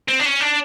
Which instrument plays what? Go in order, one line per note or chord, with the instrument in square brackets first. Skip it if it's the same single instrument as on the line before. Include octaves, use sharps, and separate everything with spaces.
[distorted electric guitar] C4
D4
C#4
D4